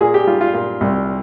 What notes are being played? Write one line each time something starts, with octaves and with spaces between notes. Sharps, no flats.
A#2 G#4
G4
G3 F4
F4
A#2 F4
C2